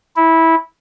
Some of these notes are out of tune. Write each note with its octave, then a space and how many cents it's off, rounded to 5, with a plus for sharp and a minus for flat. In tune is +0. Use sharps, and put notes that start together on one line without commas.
E4 -15